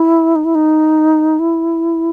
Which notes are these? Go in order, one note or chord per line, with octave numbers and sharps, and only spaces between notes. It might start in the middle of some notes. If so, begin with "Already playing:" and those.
Already playing: E4
D#4
E4
D#4
E4